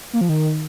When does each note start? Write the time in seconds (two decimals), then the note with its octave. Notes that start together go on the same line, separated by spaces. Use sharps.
0.13 A#3
0.21 F3
0.29 D#3